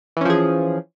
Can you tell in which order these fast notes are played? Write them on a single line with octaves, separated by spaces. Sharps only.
E3 C#4 F3 G#4